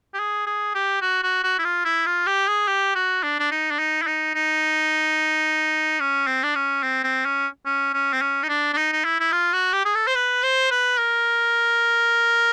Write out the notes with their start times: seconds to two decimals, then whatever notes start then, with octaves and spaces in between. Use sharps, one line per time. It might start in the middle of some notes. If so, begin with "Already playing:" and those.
0.14 G4
0.19 G#4
0.47 G#4
0.75 G4
1.02 F#4
1.23 F#4
1.43 F#4
1.59 E4
1.65 F4
1.85 E4
2.06 F4
2.27 G4
2.48 G#4
2.68 G4
2.95 F#4
3.23 D4
3.40 D4
3.51 D#4
3.71 D4
3.79 D#4
4.02 E4
4.07 D#4
4.35 D#4
6.00 C#4
6.27 C4
6.43 D4
6.55 C#4
6.83 C4
7.04 C4
7.25 C#4
7.66 C#4
7.94 C#4
8.13 C4
8.21 C#4
8.43 D#4
8.49 D4
8.73 D4
8.77 D#4
8.93 D#4
9.04 E4
9.20 E4
9.32 F4
9.53 F#4
9.73 G4
9.85 G#4
9.95 A4
10.07 C5
10.15 B4
10.43 C5
10.71 B4
10.98 A#4